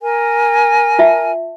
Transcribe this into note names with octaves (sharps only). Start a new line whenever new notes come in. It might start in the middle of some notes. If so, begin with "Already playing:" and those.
A#4 G#5
F4 E5 A5